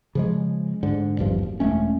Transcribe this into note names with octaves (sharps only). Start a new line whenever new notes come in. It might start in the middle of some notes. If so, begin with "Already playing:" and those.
C#3 F3 G#3
G#2 D3
D#1 G#1 G2 F3
F#1
E1 G#3 A3 C#4